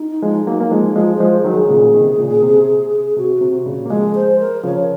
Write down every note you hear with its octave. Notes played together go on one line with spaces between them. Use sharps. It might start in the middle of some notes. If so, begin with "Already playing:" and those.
Already playing: D#4
F3 G#3
F#3 A#3
A#3
F3 G#3
F3 G#3 F4
C5
F3 G#3
D#3 F#3
G#4
A#2 C#3
C3 D#3
A#2 C#3
C3
C3 F#4
C3
A#2 C#3
A#3
F3 G#3 G#4
C5
A#4
C#3 F3 C#5